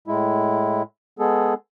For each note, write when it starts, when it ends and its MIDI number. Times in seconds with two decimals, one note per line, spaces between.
0.08 0.82 45
0.08 0.82 56
0.08 0.82 64
1.19 1.54 56
1.19 1.54 59
1.19 1.54 68
1.19 1.54 69